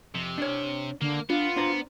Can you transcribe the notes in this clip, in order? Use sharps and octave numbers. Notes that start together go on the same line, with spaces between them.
F2 C3
D4 C#5
D3 A#3
B3 D4 F4
D4 C5 A#5